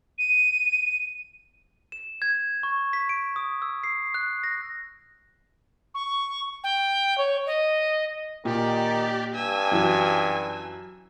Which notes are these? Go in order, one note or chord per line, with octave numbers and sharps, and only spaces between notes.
D#7
E7
G#6
C#6
B6
D7
D#6
E6
C7
F#6
A#6
C#6
G5
C#5
D#5
A#2 D#3 G4 D5
G2 G#5 E6
F#2 E3